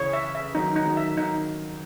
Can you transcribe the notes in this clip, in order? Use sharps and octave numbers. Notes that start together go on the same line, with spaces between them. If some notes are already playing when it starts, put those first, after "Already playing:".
Already playing: C#3 E3 C#5
E5
E5
D#3 F#3 D#4
D#4
D#3 F#3
E5
D#3 D#4